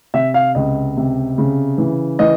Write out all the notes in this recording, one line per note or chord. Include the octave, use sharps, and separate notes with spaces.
C3 E5
F5
C#2 D#5
C3
C#3
E3
E3 D#5